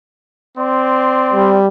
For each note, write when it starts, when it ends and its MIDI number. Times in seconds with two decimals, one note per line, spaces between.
0.58 1.62 60
0.58 1.62 74
0.58 1.62 84
1.34 1.68 55